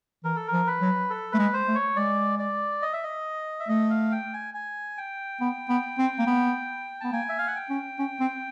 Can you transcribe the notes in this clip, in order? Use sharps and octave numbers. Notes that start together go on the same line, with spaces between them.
E3 A#4
A4
A#4
F3
B4
F#3
A4
A3 B4
G#3
C5
A3
C#5
G#3 D5
D5
D#5
E5
D#5
E5
A3 D#5
F5
G5
G#5
G#5
G5
B3
B3
C4
A#3
B3
B3 A5
A#3 G#5
E5
F5
F#5
G5
C#4
C#4
C4